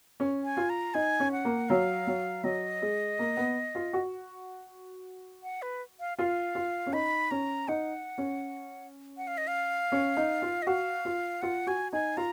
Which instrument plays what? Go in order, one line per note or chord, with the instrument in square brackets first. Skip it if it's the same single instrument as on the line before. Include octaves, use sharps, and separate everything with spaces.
[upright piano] C#4
[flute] G#5
[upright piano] F4
[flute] A#5
[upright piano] D#4 [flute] G#5
[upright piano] C#4
[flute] F#5
[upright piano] A#3
[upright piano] F#3 [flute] F5
[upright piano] F#3
[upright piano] F#3 [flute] D#5
[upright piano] G#3
A#3
B3
F4
F#4
[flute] F#5
B4
F5
[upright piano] F4 [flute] F5
[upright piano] F4
C#4
[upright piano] D#4 [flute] B5
[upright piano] C#4 [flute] A#5
[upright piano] D#4 [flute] F#5
[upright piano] C#4
[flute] F#5
F5
D#5
F5
[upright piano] C#4
D#4
F4
[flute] D#5
[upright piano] F#4 [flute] F5
[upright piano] F4
[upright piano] F4 [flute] F#5
[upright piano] F#4 [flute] G#5
[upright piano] D#4 [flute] G#5
[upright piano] F4 [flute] A#5